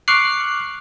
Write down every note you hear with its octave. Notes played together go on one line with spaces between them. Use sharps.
C#6 D6 F6 F#6 C7